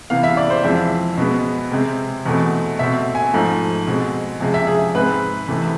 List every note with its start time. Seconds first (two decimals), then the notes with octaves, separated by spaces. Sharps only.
0.10 C3 E3 B3 F5
0.23 E5
0.37 D5
0.50 C5
0.63 F2 E3 G#3 C4 E5
1.17 B2 G#3 B3
1.72 C3 G#3 C4
2.25 E2 B2 A3 C4
2.79 B2 A3 C4 E5
3.15 G#5
3.34 G#2 F3 A3
3.87 B2 G#3 C4
4.41 F2 C3 G#3
4.54 E5
4.67 G#4
4.94 G#2 G#3 C4 B4
5.48 E2 C3 E3 A3